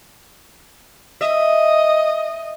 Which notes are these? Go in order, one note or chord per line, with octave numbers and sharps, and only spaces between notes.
D#5 E5